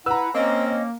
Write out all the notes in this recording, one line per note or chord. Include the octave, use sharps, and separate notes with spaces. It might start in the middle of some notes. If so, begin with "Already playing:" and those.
E4 B4 F#5 A#5 E6
A#3 C4 C#4 D#5